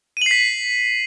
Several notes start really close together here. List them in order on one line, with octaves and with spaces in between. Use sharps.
D#7 F#7 C7 B6